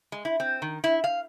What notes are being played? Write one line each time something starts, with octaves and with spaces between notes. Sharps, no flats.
G#3
E4
C4
D#3
E4
F5